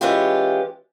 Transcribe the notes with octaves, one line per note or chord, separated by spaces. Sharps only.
E3 G#3 C#4 F4 G4